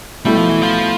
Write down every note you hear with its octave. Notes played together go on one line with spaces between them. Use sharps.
B2 G3 A3 E4
F3
E3
F3